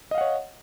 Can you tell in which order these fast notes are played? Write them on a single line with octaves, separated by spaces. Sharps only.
D#5 F5 F#5 C#5